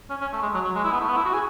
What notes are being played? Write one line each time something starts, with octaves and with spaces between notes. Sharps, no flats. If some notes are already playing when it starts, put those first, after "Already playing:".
C#4
C#4
A3
G#3
F#3
F#3
G#3
E4
B3
A3
B3
E4
F#4
G#4